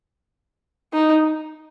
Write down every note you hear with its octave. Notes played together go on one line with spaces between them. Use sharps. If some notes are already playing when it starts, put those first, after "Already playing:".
D#4